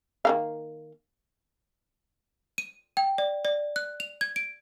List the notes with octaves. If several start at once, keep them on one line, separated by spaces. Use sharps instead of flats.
D#3 A#3 F5
D#7
G5
D5
D5
F#6
F7
G#6
D7